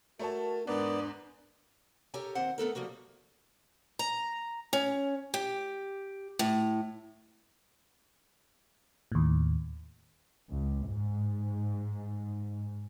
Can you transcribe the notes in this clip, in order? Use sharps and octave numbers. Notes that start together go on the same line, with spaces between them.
A3 F#4 A#4 C#5 A5
E2 G#2 B3 D4 A#4 D5
G4 A4 A#4 C#5 G#5
D#2 C4 C5 F#5
A3 B3 A4 A#4
F3 G3 A#3 F#4
A#5
C#4
G4
A2
D#2 A2
C#2
G#2